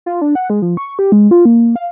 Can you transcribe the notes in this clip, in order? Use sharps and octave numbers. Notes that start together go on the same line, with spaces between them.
F4
D4
F#5
G#3
F3
C#6
G4
G#3
F4
A#3
F5